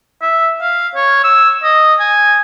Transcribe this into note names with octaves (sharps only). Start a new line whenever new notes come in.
E5
F5
C#5
E6
D#5
G#5